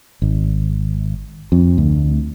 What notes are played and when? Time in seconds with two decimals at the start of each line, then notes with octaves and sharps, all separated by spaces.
0.22 G#1
1.52 F2
1.78 D2